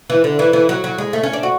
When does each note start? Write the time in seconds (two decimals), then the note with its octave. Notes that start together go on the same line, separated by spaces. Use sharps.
0.10 E3
0.24 D3
0.39 E3
0.53 E3
0.69 F#3
0.84 F#3
0.98 G#3
1.13 A3
1.23 C#4
1.33 D4
1.43 F#4